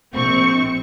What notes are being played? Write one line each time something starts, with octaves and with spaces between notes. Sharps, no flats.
A#1 C4 C#6